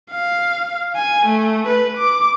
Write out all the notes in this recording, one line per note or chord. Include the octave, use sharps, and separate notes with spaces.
F5
G#5
A3
B4
D6